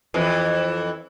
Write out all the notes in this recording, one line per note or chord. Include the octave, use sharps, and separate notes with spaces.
F2 E3